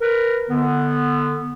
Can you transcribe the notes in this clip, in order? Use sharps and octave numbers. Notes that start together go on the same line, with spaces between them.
A#4 B4
D3 B3